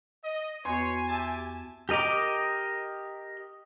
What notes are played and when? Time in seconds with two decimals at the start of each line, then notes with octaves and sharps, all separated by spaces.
0.25 D#5
0.65 E2 B3 F#4 B4 C#5 G#5 C6
1.08 G4 E5 A5
1.89 G4 A#4 D#5 A#5 D6